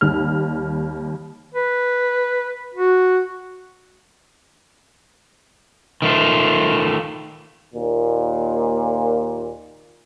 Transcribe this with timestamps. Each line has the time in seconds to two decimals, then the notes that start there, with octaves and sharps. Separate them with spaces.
0.01 D#2 G3 F6
1.54 B4
2.75 F#4
6.02 D#3 A3 F4
7.74 D#2 A#2